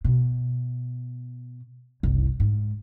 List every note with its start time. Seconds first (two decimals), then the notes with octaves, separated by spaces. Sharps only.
0.05 B2
2.03 F#1 C2
2.40 G#2